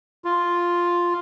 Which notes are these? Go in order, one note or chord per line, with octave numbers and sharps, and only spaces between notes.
F4